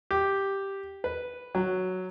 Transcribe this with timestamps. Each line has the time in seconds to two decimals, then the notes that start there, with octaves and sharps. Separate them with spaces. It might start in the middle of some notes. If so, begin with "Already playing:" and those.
0.11 G4
1.04 B4
1.55 F#3